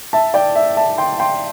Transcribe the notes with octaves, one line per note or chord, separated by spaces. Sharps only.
E5 A5
D5 G5
E5
E5 A5
G5 C6
G5 C6